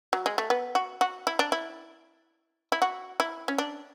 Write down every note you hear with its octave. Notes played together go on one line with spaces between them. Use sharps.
F#3
G#3
A3
B3
F#4
F#4
E4
D4
E4
E4
F#4
E4
C#4
D4